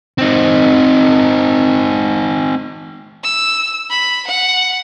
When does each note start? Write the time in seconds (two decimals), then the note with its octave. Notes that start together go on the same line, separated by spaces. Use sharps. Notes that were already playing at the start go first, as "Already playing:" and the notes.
0.19 C4 D#4
3.24 E6
3.90 B5
4.27 F#5